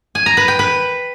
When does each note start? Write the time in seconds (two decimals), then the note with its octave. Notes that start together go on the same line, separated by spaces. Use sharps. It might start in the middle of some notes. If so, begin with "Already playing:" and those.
0.15 G#5
0.26 A#5
0.37 B4
0.48 G5
0.59 B4